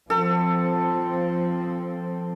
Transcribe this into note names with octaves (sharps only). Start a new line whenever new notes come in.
F3 C4 A4